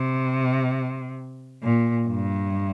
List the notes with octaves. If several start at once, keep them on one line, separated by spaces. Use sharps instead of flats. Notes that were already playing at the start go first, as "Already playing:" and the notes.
Already playing: C3
A#2
G2